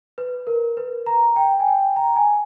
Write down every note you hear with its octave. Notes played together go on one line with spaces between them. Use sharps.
B4
A#4
B4
A#5
G5
G#5
G5
A#5
G#5